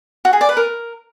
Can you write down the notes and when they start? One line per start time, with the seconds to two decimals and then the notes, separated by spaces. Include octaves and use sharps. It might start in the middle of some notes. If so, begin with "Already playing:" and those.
0.25 F#4
0.33 G#4
0.41 D5
0.49 B4
0.57 A#4